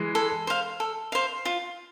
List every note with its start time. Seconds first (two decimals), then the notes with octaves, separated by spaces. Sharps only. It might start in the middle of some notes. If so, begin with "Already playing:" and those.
Already playing: E3 G#3
0.15 A4
0.47 C5 F5
0.80 A4
1.12 C5 F5
1.45 F4